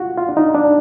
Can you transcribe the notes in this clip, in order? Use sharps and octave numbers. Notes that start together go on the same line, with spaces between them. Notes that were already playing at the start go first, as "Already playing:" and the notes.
Already playing: F4 F#4
F4
D4
D#4
D4